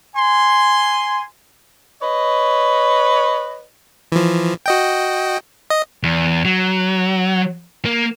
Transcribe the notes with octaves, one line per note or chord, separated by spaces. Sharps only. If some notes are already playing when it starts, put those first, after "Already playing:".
G#5 C6
B4 C#5 D#5
E3 F3
F#4 D#5 G5
D#5
E2
F#3
A#3